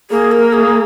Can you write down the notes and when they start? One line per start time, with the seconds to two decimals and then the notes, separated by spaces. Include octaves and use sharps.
0.11 A#3 G#4
0.32 A#4
0.53 G#4